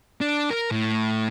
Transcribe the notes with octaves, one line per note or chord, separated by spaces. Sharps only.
D4
A#4
A2